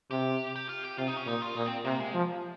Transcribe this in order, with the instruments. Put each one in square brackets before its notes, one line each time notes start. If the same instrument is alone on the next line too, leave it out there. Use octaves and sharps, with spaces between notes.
[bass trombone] C3 [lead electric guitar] G4
[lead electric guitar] G4
F4
G4
[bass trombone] C3 [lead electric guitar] F4
[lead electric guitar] D#4
C#4
[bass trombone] A#2 [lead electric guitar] D#4
[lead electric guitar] F4
[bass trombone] A#2 [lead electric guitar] D#4
[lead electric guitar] C4
[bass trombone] C3 [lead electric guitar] A#3
[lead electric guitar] G#3
[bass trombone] F3